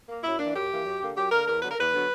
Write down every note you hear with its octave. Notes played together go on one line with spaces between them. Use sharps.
A#3
F#2 E4
E3 A#3 D4
F#2 G4
E3 A#3
F#2
D3 A#3
F#2 G4
D3 A#3 A#4
E2 A#4
D3 F#3 B3 B4
A#4
E2 B4
D3 F#3 B3